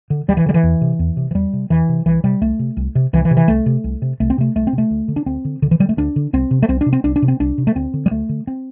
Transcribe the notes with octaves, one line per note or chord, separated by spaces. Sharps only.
D3
D2 G3
E3
D3 G3
E3
E2
C3
E2
C3
E3
E2 G3
C3
E2 E3
C3
C2 E3
C3 G3
C2 A3
C3
C2
C3
C2 E3
E3
C3
E3
C2 A3
C3
C2
C3
C2 A3
C4
C3 A3
C2 A3
C4
C3
A3
D2
D3
D4
D2 C4
D3
D2 D3
E3
D3 G3
A3
D2 D4
D3
C2 C4
C3
A3
C2 C4
D4
C3
C4
C2 D4
D4
C3
C4
C2 D4
C3
A3
D2 C4
D3
G3
D2 A3
D3
C4